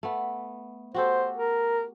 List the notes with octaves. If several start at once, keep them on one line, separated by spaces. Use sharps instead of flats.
A3 B3
F#4 G4 A4 C5
A#4